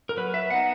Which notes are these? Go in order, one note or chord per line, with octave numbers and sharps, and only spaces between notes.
A#4
F#3 B4
E5
B3 D#4 F#5